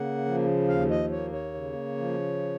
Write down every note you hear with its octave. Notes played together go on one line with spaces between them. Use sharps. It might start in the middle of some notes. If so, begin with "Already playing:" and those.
Already playing: C#3 A#3 F#5
F3
D#2 F5
D#5
A#3 C#5
C#5
C#3
F3